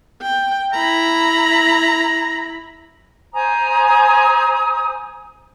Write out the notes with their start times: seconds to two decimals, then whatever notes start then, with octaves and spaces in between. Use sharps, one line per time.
0.22 G5
0.73 E4 A#5 B5
3.34 C5 G#5 A#5 D#6